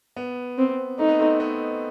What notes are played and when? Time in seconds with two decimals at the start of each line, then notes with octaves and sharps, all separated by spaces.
0.17 B3
0.58 C4
0.99 A3 D#4
1.09 B3
1.19 A3 C4
1.40 B3 D#4